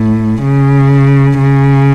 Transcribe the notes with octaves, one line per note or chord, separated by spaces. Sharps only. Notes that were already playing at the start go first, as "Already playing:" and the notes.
Already playing: A2
C#3
C#3